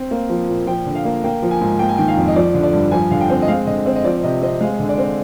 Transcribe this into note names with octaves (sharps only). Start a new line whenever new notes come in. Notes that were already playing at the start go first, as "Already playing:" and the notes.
Already playing: C4
A#3
F3
A#2
F3 G5
D3
F5
A#3
A#3 G5
F3
G#5
G#2
A#3 G5
G#5
D#3 G5
F5
F2
D#5
F3 D5
D3
D5
G2
F3 G#5
D3 F5
G5
C4
D#5
G#3 F5
D3 D#5
C4
D#5
F3 D5
C3 D#5
C4 D#5
G#3 F5
D3
D5
C4